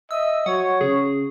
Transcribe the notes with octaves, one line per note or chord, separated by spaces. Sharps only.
D#5 E5 E6
F#3 C#5 F#5
C#3 G#4